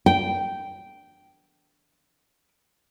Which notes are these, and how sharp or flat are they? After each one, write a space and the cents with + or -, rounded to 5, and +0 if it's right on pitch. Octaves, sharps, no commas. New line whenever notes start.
G5 -10